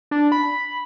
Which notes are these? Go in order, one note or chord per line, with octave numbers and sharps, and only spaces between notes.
D4
B5